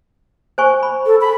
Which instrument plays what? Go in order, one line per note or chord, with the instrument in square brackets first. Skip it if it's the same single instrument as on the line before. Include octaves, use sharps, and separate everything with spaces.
[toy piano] C5 G#5 C#6
B5
[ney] A4
B5